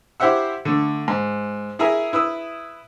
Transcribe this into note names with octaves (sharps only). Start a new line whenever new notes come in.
E4 G4 C5 E5 F#5 E6
D3 A3
G#2
E4 G#4 A#4 E5 A#5
E4 B4 D#6 E6